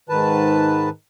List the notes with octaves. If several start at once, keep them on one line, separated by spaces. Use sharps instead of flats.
G#2 D#3 B4 A5